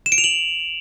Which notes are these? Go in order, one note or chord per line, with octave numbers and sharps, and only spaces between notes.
E7
D7
F7
F#7